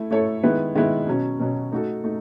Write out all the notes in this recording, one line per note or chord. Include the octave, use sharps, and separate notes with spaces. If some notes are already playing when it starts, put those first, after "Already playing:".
Already playing: A3 E4 A4
A3 E4 A4 C#5
D#3 G#3 B3 E4 B4
D#3 G#3 B3 E4 B4
B2 F#3 C#4
B2 F#3 C#4
A3 D#4 F#4 A4
A3 D#4